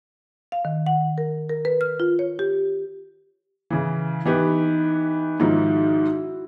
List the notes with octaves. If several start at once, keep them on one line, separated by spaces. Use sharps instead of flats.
F5
D#3
F#5
A#4
A#4
B4
F6
F4
C#5
G4
C#3 E3
E3 B3 D#4 G4
G#2 D#3 F3 E4 F#4